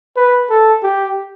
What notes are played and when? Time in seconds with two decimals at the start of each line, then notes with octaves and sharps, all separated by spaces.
0.17 B4
0.50 A4
0.83 G4